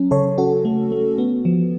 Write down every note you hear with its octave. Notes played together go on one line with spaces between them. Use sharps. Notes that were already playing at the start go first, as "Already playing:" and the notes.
Already playing: F#3 C#4
C#3 A4 C#5
C#4 F#4 A4
A3
A3
B3
F3